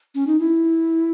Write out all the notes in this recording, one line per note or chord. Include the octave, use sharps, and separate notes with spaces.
C#4
D#4
E4